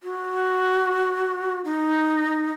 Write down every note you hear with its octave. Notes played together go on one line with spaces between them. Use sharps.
F#4
D#4